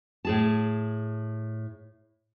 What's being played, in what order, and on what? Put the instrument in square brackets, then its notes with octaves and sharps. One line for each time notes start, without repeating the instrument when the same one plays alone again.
[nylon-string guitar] A2 G#4 A5